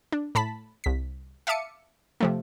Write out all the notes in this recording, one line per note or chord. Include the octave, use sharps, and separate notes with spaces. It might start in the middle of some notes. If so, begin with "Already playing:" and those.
D4
A2 A5 B5 B6
C2 B6
E5 F5 A5 D6 C#7 D#7
C3 F3 A3